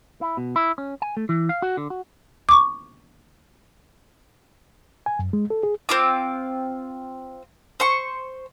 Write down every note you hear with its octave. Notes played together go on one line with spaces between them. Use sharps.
E4
B2
E4
C#4
G#5
A3
E3
F5
F#4
D3
F#4
C#6 D6
G#5
F#2
G#3
A4
G#4
C4 F4 D6
C5 C#6